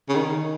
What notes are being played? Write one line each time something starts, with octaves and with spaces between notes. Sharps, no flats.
C#3
D#3